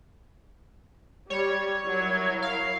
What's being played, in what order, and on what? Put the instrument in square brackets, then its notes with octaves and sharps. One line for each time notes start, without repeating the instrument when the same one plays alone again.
[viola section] G3 [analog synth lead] C#5
[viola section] F#3 E4 A#4
[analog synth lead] F5